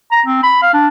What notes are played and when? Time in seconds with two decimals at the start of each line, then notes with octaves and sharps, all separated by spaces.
0.12 A#5
0.26 C4
0.44 B5
0.62 F5
0.74 D4